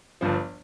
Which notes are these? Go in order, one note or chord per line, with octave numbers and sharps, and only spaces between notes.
G1 G2 F3